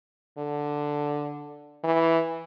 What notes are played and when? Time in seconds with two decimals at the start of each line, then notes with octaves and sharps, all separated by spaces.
0.38 D3
1.84 E3